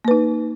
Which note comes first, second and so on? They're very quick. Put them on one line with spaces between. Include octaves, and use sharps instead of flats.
A#3 B4 D#4